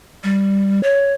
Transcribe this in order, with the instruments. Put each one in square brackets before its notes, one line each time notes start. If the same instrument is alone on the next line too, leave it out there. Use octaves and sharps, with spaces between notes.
[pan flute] G3
C#5